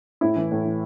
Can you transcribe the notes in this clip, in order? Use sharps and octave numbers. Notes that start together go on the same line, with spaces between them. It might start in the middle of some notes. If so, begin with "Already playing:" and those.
A2 E4
E3
A2
E3